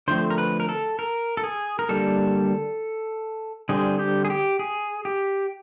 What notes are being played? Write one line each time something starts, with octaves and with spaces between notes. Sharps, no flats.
D3 F3 A3 C4 C5
A#4
B4
A#4
A4
A#4
A4
G#4
A#4
D3 G3 A#3 A4
D3 G3 C4 G#4
G4
G#4
G4
G#4
G4